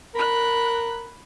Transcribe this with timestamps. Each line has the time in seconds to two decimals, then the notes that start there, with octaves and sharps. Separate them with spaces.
0.15 A#4 B5 F#6